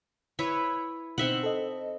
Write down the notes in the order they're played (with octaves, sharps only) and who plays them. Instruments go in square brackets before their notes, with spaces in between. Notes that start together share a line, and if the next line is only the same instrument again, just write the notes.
[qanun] E4 B4 C#5
[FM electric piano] B2 D#4 [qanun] C4 E5 F#5
[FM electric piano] A4 D#5